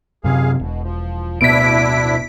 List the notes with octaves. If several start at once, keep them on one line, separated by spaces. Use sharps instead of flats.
F#2 C3 G#4 F5
E1 B2
F3
D1 D2 B2 B3 D4 E4 B6 D7